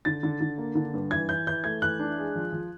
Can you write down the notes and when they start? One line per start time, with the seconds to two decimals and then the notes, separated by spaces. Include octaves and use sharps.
0.05 D3 A6
0.23 D3
0.41 D3
0.58 A#3
0.75 D3
0.94 G2
1.11 E3 G#6
1.29 E3 G6
1.47 E3 G6
1.64 A3 G#6
1.82 E3 F#6
1.99 D4
2.18 G#3
2.36 F3
2.53 F3